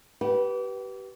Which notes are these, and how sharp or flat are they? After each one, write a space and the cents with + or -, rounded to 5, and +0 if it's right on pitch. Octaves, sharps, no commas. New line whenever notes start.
G4 -30 B4 -15 F#5 +15